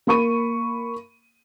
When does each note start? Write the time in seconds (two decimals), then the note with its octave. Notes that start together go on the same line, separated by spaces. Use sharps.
0.07 A#3 B5 C#6 D#7